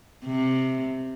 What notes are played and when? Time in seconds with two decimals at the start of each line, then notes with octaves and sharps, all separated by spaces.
0.25 C3